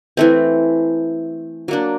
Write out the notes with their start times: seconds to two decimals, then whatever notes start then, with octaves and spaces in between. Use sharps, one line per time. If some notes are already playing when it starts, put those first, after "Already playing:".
0.17 E3 A3 C4
1.68 F#3 A#3 D4